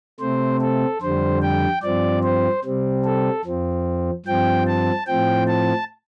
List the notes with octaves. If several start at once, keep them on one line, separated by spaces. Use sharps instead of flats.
C3 A3 C4 C5
A4
F2 D3 G3 C5
G5
G2 F3 C4 D5
C5
C3 G3 C4
A4
F2 F3 C4
G2 F3 C4 G5
A5
A2 F3 C4 G5
A5